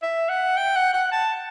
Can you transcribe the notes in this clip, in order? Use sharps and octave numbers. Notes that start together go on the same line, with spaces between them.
E5
F#5
G5
F#5
F#5
A5